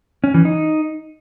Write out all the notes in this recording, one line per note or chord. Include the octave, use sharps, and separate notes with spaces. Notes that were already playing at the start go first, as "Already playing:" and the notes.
C#4
E3
D#4